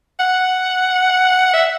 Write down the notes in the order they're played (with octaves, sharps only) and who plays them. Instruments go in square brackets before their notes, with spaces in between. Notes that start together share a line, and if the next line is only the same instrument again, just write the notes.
[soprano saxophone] F#5
E5